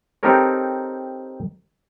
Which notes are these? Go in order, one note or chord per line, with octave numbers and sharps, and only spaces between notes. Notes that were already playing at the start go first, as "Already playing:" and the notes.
C4 D#4 G4 A4 A#4 C#5